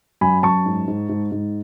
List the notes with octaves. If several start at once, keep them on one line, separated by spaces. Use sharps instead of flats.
F#2 G#5 B5
F#2 A5 C#6
G#2
G#2
G#2
G#2